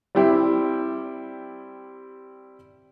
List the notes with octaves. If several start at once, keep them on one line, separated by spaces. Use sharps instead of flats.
G3 C4 E4 G4